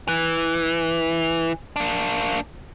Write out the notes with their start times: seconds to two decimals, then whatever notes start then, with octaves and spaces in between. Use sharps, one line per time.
0.08 E3
1.76 A#3 D4